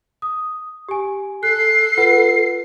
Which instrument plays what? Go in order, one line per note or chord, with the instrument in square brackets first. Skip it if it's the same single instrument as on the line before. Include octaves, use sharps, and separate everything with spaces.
[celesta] D#6
G4 G#5
[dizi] A4 [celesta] F#6 [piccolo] C7
[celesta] F4 B4 F#5